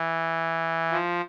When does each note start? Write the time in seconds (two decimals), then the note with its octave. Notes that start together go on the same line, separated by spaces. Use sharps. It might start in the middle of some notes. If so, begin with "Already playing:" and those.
Already playing: E3
0.92 F3